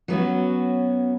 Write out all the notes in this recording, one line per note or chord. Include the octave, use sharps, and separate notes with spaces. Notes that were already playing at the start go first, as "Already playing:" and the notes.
F#3 B3 C#4 F#4